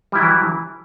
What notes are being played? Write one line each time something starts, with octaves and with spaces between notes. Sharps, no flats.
E3 F#3 G3 E4